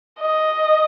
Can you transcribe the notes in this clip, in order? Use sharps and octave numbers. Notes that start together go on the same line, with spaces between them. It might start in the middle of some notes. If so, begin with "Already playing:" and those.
D#5